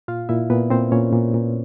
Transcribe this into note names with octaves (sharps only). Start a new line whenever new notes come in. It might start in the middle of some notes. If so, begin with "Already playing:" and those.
A#2 F4 F5
A#2 E4 E5
A#2 B3 B4
A#2 C4 C5
A#2 C#4 C#5
A#2
A#2